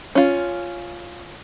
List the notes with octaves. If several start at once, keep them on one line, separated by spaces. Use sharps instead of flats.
C#4 F4